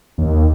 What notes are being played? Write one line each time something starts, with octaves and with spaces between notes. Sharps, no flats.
D#2